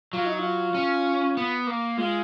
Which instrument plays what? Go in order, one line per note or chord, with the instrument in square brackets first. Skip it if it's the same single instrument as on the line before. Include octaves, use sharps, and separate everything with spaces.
[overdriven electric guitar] F#3 [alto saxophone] F4
[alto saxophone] D#4
F4
[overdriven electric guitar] C#4
B3
A#3
[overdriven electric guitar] G#3 [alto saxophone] F4